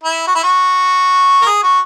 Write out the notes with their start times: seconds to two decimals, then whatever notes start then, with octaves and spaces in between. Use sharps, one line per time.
0.04 E4
0.27 F#4
0.35 E4
0.44 F#4
1.42 A#4
1.47 G#4
1.63 F#4